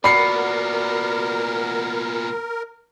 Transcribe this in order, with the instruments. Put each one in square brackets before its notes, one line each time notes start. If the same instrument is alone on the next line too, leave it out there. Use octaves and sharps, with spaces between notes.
[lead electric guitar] A#2 B3 [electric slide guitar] F#4 D5 [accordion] A#4 [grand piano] B5 C7 C#7